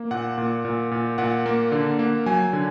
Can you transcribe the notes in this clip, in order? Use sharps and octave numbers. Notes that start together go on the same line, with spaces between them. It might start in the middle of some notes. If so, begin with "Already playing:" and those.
Already playing: A#3
A#2 F#5
A#2
A#2
A#2
A#2 F#5
A#3
D3
A#3
F#3 G#5
D3